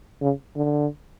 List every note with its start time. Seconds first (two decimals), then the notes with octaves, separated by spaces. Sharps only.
0.22 C#3
0.56 D3